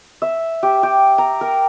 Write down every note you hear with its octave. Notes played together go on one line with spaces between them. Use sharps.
E5
G4
G4
A#5
A#4